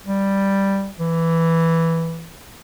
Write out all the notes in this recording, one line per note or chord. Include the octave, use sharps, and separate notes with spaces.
G3
E3